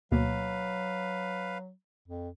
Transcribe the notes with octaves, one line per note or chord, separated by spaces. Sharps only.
D2 B2 F#3 A#3 B4 F5
F2